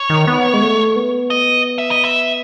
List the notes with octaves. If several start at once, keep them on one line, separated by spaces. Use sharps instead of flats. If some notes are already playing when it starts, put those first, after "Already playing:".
Already playing: C#5
D#3
B3
G#3
A3
B3
D#5
E5
D#5
E5